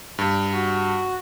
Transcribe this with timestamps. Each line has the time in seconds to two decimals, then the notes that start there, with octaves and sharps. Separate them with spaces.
0.18 G2
0.53 F#4